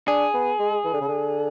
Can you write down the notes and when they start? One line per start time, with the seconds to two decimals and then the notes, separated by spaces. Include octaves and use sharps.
0.08 D4 G#4
0.34 B3
0.59 G#3
0.85 E3
0.93 D3
1.01 C#3
1.08 D3